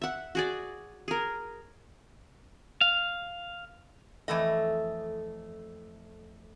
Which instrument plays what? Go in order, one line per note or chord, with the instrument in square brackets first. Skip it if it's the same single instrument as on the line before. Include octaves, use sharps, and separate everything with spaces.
[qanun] E5 F#5
F#4 G#4 D5
G#4 A#4
[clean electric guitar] F5
[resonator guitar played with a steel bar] F2 E3 A3 D#5